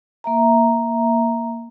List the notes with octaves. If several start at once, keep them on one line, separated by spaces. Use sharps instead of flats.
A#3 E5 A#5